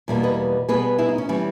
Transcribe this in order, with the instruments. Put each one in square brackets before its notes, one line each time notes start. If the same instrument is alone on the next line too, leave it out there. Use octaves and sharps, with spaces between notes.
[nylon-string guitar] E2 B2 G3 A#3
B4 D#5
B2 G3 B3 G#4 B4
E4 G#4
D#4
C#4
E3 G3 B3 C#4